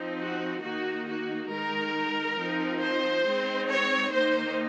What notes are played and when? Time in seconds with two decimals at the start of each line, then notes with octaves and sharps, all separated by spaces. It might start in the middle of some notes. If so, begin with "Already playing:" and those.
Already playing: F3 C4 D#4
0.18 F#4
0.62 D#3 A#3 D#4 F#4
1.06 F#4
1.50 D#3 G#3 D#4 A#4
2.39 F3 C4 D#4
2.82 C5
3.26 G#3 C4 D#4
3.70 C#5
4.13 D#3 A#3 D#4 C5